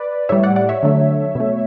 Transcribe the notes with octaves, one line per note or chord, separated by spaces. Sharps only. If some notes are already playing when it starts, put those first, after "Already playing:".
Already playing: B4 D5
A2 G3 C#5 E5
D5 F#5
D5 F#5
C#5 E5
D3 F#3 A3
B2 A3